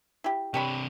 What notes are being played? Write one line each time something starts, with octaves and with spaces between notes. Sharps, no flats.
E4 G4
C3 D4 G4 C#5 B5